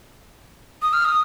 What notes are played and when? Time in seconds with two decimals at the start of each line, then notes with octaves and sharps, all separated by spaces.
0.82 D#6
0.93 F6
1.05 D#6